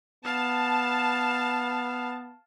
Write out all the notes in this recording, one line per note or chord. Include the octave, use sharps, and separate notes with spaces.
B3 F5 A5